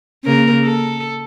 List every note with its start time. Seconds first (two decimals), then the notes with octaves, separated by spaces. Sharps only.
0.24 C#3 A#3 A#4
0.64 A4